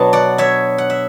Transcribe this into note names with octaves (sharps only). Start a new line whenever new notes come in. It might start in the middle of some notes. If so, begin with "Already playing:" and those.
Already playing: B2 F#3 B3 D4 A5
D5 F#5
C#5 E5
F#5
E5